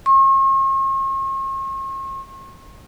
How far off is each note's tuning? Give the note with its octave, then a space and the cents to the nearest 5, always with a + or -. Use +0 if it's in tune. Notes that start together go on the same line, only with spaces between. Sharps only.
C#6 -45